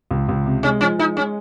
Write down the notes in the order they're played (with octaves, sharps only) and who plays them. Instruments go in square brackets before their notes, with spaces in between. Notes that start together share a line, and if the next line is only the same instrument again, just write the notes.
[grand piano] C#2
C#2
C3
[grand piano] G#3 [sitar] C#4
[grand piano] F3 [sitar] C#4
[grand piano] G#3 [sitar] D#4
[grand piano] G#3 [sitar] C#4